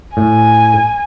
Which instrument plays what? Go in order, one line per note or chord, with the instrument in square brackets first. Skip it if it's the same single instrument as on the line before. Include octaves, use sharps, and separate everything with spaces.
[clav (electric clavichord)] A2 [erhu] G#5